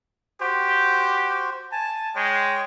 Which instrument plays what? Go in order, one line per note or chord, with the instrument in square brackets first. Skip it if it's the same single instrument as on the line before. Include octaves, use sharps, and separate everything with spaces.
[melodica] F#4 C5 [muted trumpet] G4
[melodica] G#5 [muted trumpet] A5
[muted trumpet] G#3 [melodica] C#5 G5